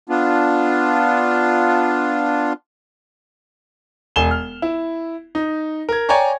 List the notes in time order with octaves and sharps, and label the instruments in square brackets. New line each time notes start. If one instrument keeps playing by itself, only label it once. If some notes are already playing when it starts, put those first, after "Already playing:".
[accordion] B3 D4 F4
[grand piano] E1 G#5 E7 G7
F6
E4
D#4
A#4 G#6
C#5 D5 G5 G#5 A#5 C#6